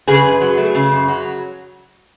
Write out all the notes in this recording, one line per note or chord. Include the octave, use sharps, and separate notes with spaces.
C#3 G#4 B4
F#2
F#3
A3
C#3
F#2
F#3